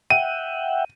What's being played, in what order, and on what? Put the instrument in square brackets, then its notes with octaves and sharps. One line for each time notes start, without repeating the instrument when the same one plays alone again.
[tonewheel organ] E5 F#5 G5 [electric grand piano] D#7